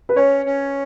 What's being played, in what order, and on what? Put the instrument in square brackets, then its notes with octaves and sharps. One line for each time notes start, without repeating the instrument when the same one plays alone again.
[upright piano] B4
[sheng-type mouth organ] C#4 [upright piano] C#5
[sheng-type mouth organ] C#4